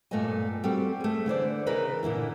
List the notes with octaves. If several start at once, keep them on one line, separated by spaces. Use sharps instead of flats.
G2 A#2 A3 B3 D#5 G#5
G3 C4 F#4 A4
A3 G#4
D3 E3 C5 D5
C#3 E3 G#4 A#4 B4 D#5
A#2 D3 E3 E4